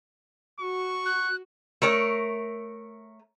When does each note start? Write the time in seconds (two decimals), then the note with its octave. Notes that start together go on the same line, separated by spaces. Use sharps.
0.60 F#4 C#6
1.06 F#6
1.82 A3 A#4 C#5